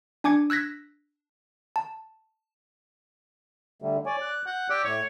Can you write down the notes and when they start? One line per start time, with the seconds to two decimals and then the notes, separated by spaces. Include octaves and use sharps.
0.24 D4 G#5 D6 G#6 C#7
0.50 E6 F#6 G#6 A#6 B6
1.76 A5
3.82 D3 G3 A3
4.06 C#5 D5 G#5
4.22 F#6
4.46 F#5 G6
4.70 G4 D5 D6 E6
4.84 A2 C#5